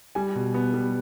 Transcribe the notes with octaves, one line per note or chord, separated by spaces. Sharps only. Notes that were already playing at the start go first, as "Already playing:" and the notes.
G3 G#5
B2
B3
G3